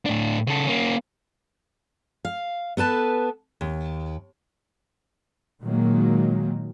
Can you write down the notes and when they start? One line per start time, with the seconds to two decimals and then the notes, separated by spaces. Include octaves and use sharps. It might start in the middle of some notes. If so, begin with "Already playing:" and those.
0.05 A2 D4
0.47 C#3 A4
0.67 A#3 C#4
2.25 F5
2.77 B3 A4 B4 A5
3.61 D#2
5.62 A#2 D#3 F#3 G#3 A#3